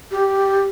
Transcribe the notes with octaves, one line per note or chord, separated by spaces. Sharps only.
G4